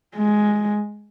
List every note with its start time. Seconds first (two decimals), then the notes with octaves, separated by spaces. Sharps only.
0.16 G#3